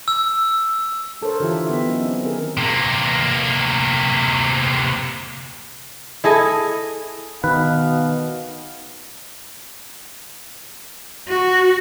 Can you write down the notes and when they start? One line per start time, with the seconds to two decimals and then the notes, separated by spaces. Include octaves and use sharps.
0.08 E6
1.21 D4 A4 A#4 C5 C#5
1.40 D3 E3 F4 G4 E5
1.67 B3 E5
1.87 F#3 C#4 D#4
2.04 C4
2.25 D#3 G#4 A#4
2.57 C3 A#3
6.24 E4 G#4 A4 D#5
7.44 B2 D#3 B4 D#5 F5
11.28 F#4